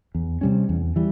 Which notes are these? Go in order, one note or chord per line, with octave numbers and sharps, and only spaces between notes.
E2
C3 G3 C#4
E2
E3 G3